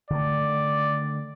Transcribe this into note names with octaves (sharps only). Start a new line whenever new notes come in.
D3 D#3 A3 D5